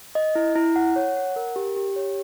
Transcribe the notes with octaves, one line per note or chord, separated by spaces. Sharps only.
D#5
E4
E4
F#5
C#5
F#5
A#4
G4
G4
C#5